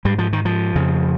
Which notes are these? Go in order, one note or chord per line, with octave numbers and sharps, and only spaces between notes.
G#2 G3
F3
D#3
F3
F2 C#3